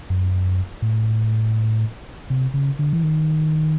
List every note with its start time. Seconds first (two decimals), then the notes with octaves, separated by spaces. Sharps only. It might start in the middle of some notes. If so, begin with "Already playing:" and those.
0.10 F#2
0.82 A2
2.30 C3
2.54 C#3
2.79 D3
2.93 E3
3.03 D#3